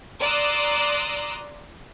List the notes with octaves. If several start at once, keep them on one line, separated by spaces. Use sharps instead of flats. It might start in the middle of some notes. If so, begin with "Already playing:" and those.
D5 A#5 C6 D#6 E6 F#6